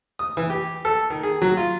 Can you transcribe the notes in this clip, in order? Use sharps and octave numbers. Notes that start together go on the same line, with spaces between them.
D#6
E3
G4
A4
D#3
G#4
F#3
F4